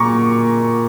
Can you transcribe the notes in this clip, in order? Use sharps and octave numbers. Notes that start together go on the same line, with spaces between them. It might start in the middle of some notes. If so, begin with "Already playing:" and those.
Already playing: A#2 A#5 C#6 D6